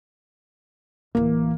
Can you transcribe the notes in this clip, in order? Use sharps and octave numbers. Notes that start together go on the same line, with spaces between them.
D1 E3 A#3